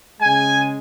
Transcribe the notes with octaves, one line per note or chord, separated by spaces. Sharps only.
C#3 G#3 G#5